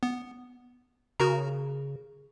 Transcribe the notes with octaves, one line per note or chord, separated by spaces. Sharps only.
B3
C#3 F#4 A#4 A#5